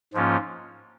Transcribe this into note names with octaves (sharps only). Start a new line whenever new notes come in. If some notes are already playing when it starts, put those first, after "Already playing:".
G#2 F3 A#3 C#4 F4